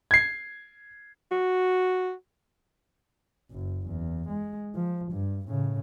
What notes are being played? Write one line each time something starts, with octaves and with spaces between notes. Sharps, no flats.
G#6 C7
F#4
F#1 F#2
E2
G#3
F3
G2
A2 C#3